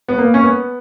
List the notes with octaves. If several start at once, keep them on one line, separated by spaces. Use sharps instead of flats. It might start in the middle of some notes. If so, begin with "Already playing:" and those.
B3
A#3
C#4
B3